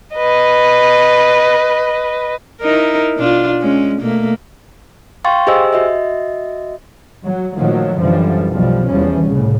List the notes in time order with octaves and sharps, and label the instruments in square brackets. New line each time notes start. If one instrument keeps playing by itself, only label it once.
[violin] B4 D#5
[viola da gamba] D#4 E4 A#4
B2 D4 F4
G#3 C#4
B2 A3 A#3
[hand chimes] F5 G5 C6 C#6 A6
G4 G#4 C5 D#5 G#5 E6
F#4 D#5 E5
[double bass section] F#3
A#2 D#3 F3 F#3 A3
F#2 D3 E3 F3 G3
B1 B2 F3 G3
E2 E3 F3 G3 C#4
C2 A2 C#3